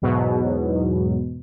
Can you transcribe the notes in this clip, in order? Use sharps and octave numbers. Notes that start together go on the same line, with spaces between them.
E2 G#2 B2 F#3